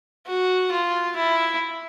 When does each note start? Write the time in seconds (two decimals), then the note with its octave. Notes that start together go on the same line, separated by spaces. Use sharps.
0.27 F#4
0.72 F4
1.16 E4